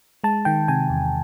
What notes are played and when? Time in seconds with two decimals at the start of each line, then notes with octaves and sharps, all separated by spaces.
0.24 G#3 A5
0.45 D#3 G5
0.68 C3 G#5
0.90 E2